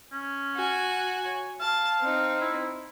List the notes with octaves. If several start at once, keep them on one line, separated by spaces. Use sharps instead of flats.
C#4
F#4 G#5
C#5
F5 A5
C4 D#4
E4